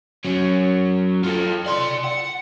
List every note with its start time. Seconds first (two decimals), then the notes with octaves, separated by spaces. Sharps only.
0.25 F#3 C#4
1.24 F4 A4
1.66 D5 C6
2.04 F#5